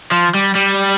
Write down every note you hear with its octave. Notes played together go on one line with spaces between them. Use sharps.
F3
G3
G3